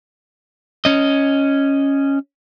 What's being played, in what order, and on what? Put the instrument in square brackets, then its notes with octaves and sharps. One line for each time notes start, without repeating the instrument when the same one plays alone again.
[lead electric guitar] C#4 D#5